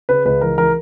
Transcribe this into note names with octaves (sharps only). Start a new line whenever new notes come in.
C#3 B4
C#2 B4
E3 A#4
E3 A#4